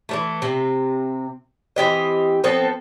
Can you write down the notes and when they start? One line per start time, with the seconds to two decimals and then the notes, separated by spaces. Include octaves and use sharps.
0.09 E3 G3 A3
0.42 C3 C4
1.76 E3 C4 G4 D#5
2.44 F3 B3 C4 A4